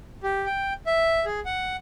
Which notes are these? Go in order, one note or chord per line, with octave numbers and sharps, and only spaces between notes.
G4
G5
E5
G#4
F#5